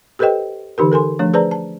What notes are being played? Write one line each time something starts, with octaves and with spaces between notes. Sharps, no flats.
G4 A4 B4 C5 D#5 G5
D3 E3 D#4 G4 A#4
A4 A#4 G#5 C6
F3 A3 D4 C#5
G#4 B4 C5 D5 A5 A#5
A5